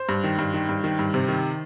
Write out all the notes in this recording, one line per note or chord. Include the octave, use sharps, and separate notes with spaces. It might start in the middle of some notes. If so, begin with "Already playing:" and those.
Already playing: C5
G2
D#3
G2
D#3
G2
D#3
G2
C3
D#3